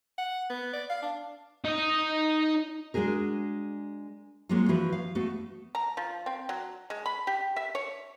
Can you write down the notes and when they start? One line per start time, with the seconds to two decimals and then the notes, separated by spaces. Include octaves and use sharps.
0.18 F#5
0.50 B3
0.73 D5
0.90 F5
1.03 D4
1.65 D#4 D#5
2.94 G#3 D4 F#4 G#4 A#4
4.49 F#3 G#3 A#3 C4 F4
4.68 E3 F3 F#4 B4 E5
4.92 F5
5.15 A3 B3 F#4
5.75 A#5
5.97 F3
6.26 C4
6.49 F#3
6.90 G#3
7.06 B5
7.27 G4
7.56 E5
7.75 C#5